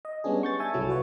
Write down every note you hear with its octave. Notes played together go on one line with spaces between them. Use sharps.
D#5
G3 G#3 B3 C#4 D4 G#4
C#6 G6 A6
E5 G#5 A5 E6
C2 F#3 E4 A4
F4 B4 C#5